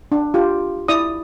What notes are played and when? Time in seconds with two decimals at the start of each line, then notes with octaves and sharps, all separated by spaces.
0.12 D4
0.34 F4 G4
0.88 E4 D5 D#6